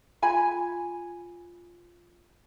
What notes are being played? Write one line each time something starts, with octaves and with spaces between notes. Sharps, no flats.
F4 G#5 B5